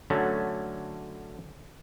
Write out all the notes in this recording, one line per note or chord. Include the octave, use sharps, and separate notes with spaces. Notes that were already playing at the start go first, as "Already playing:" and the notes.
D3 F#3 A3 C#4